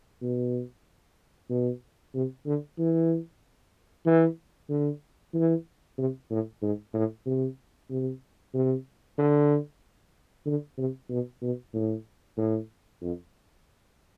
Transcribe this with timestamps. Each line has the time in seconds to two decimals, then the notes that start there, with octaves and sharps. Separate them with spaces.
0.22 B2
1.50 B2
2.15 C3
2.46 D3
2.78 E3
4.06 E3
4.70 D3
5.34 E3
5.98 C3
6.30 A2
6.62 G#2
6.94 A2
7.26 C3
7.90 C3
8.54 C3
9.18 D3
10.46 D3
10.78 C3
11.10 B2
11.42 B2
11.74 A2
12.38 A2
13.02 F2